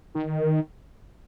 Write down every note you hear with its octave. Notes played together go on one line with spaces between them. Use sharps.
D#3